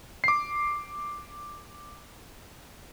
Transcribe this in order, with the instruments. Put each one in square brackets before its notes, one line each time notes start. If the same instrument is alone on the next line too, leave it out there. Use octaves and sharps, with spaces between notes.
[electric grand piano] D6 C7